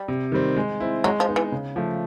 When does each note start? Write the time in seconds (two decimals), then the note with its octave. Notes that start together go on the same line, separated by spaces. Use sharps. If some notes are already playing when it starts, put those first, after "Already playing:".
Already playing: G3
0.08 C3
0.32 D#3 G3 C4
0.56 G#3
0.80 C4 E4
1.04 F#3 G#3
1.20 F3
1.28 B3 D#4
1.36 E3
1.52 C#3
1.76 F3 A3